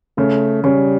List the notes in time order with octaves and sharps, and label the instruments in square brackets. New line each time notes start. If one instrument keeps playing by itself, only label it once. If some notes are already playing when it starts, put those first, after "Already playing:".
[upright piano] C#3 [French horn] A3
[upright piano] C#3 [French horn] G3